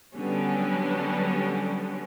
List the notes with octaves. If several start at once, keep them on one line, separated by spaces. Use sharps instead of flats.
D3 F#3 G3 B3 C#4